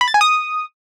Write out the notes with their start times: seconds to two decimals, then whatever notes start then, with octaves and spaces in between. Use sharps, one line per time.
0.01 B5
0.08 A6
0.14 G#5
0.21 D#6